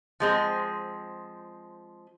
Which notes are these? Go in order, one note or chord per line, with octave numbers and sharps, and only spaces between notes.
F3 G#3 C4